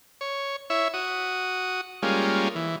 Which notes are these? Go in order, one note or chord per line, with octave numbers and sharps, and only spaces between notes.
C#5
E4 C#5 E5
F#4 D#6
G3 G#3 A#3 C#4 F4
E3